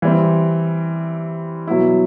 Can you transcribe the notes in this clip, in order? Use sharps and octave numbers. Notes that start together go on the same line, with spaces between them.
E3 G3 C4
B2 F#3 B3 E4